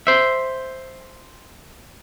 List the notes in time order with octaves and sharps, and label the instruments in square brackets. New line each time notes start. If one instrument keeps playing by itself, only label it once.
[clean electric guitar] C5 E5